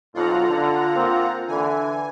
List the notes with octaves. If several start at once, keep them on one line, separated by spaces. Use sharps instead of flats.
B1 F2 F4 F#5 A#5
D3
A#3 C4
D3 E3 G#5